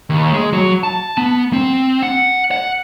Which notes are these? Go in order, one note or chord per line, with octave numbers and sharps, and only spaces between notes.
D#2
G#3
F#3
A5
B3
C4
F#5
F#5